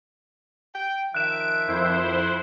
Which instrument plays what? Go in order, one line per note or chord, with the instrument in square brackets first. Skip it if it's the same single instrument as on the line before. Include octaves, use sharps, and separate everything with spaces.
[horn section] G5
[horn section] D#3 F3 E5 [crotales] F#6 E7 [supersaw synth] D7
[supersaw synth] F2 E4 C5